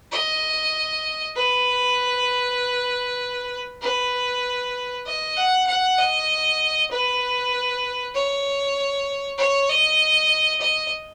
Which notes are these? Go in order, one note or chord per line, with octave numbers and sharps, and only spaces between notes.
D#5
B4
B4
D#5
F#5
F#5
D#5
B4
C#5
C#5
D#5
D#5